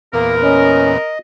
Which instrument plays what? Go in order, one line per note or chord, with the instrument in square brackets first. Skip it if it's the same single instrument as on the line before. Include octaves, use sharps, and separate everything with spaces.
[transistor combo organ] E2 A#2 B3 [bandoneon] A#3 [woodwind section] A#4
[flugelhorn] C#4 [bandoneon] D#5